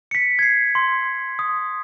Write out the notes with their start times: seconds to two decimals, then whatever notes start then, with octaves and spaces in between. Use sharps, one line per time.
0.11 B6 C#7
0.39 G#6 C7
0.75 C6
1.39 D#6